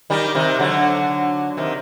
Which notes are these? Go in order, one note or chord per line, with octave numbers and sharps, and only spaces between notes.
D#3 G3
C3 D#3
D3 F#3
C3 D#3